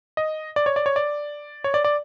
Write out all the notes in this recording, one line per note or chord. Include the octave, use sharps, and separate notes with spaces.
D#5
D5
C#5
D5
C#5
D5
C#5
D5
D5